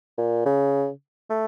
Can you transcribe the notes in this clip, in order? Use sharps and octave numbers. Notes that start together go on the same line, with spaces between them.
A#2
C#3
A3